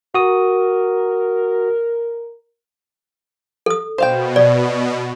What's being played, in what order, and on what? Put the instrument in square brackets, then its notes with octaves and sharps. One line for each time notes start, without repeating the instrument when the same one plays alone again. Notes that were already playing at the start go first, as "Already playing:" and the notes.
[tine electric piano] F#4 D#6 [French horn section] A#4
[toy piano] A4 D#6
[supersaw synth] B2 [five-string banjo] C5 F5 G5
[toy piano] D5